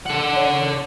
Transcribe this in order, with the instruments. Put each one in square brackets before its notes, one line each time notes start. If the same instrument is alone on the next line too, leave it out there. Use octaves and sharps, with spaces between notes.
[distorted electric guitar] A4 F#5
[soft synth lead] C#5